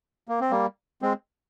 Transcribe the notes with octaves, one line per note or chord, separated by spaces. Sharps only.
A#3
C4
G3 A#3
G#3 C4